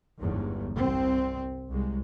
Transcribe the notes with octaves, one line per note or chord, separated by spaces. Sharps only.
G1 E2 G#2
C2 C4
C2 G#3